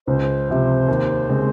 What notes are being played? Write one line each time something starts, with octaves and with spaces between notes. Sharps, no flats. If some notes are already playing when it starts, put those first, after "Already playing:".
C#2 C5
C3 F3 C4
D#2
C#3 G#3 C4